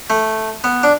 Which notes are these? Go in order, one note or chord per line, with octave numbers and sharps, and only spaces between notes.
A3
B3
D4